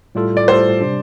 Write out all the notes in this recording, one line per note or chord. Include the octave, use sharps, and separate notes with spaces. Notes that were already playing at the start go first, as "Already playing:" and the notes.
A2 G3 F4 A4
D5
A2 G3 F4 A4 C5
C3 G3 D4